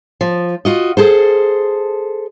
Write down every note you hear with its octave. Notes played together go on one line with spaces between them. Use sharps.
F3
F4 F#4 D#5
G#4 A4 C5